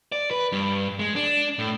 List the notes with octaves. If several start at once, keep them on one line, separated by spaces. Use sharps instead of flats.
D5
B4
G2
G#3
D4
A2